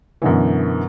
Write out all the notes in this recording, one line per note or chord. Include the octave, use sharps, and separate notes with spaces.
F#2 B2 D3 E3